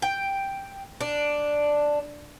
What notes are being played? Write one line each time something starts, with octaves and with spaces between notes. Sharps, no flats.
G5
D4